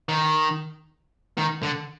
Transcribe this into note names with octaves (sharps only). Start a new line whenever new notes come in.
D#3
D#3
D3